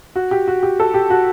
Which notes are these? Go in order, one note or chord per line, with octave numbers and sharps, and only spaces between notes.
F#4
G4
F#4
G4
A4
G4
F#4